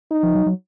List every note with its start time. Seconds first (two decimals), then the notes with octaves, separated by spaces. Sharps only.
0.11 D#4
0.23 F3
0.35 F#3
0.46 F#3